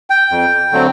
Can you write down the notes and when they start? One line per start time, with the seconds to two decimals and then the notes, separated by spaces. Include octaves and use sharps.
0.10 G5
0.31 F2
0.72 D3 F#3 A3 C4